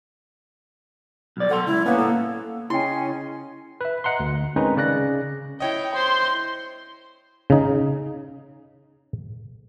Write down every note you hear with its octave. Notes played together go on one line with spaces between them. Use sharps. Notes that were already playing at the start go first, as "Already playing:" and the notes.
B1 D5
B1 A4 F#5 C6
C#2 E4
A#3 B3 C#4 B4
A2 A4
C#3 C#4 D#4 E4 G5 G#5 C6
B4 E5
D#5 F#5 A#5 C6
D2
D#3 G#3 C4 C#4 D#4 B4
C#3 D5 F#6 A#6
E4 C#5 D#5 G5
C5 C6
C#3 D#4